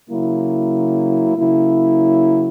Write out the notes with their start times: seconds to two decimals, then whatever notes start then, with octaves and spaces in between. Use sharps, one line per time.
0.10 C#3 F#3 A#3 E4
1.37 C#3 F#3 A#3 E4